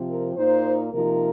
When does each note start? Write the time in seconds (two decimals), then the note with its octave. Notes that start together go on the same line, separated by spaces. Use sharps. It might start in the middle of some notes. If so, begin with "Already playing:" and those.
Already playing: C3 F3 C4
0.08 A#4
0.36 A#2 A#3 D#4 C5
0.92 C3 F3 A#3 D#4 A#4